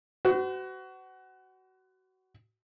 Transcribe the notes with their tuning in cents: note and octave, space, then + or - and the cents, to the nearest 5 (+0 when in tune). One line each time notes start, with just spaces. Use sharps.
F#4 +25 C5 -45